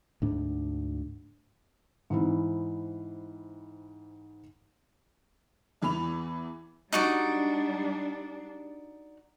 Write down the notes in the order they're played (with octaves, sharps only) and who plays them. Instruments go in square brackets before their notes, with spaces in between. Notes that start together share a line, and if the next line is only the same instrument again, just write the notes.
[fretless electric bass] D2 G#2 D4
[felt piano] G#2 E3 C4 E4
[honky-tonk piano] E2 E3 B3 B5 F7
[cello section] G3 D4 [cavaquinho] D#4 F#4 D5